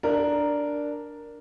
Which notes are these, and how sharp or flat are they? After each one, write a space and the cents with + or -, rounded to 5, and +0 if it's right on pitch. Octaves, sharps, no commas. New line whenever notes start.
D4 +0 A#4 +0